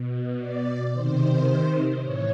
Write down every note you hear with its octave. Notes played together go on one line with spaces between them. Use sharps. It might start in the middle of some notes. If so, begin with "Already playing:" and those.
Already playing: B2
D5
C3 D#3 C5
A2 E3 C#5